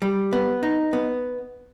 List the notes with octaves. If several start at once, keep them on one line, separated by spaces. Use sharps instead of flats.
G3
B3
D#4
B3